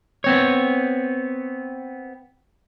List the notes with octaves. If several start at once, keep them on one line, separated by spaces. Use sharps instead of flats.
B3 C4 C#5